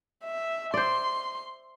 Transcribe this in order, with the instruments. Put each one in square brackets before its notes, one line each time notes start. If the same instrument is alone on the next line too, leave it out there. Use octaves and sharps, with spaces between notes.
[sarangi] E5
[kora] C5 D5 [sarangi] C6